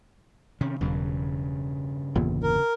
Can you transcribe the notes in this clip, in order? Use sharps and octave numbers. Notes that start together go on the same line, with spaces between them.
C3 D#3 C#4
E1 G2 C#3 F#3
G1 E2 A#2
A#4